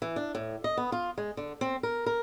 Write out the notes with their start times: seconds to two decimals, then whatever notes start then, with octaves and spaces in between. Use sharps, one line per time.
0.02 E3
0.16 D4
0.35 A2
0.64 D#5
0.77 B3
0.92 F4
1.18 G#3
1.37 D3
1.61 C4
1.83 A#4
2.06 A#4